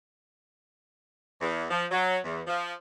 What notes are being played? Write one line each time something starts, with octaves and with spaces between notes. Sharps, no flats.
E2
F3
F#3
E2
F3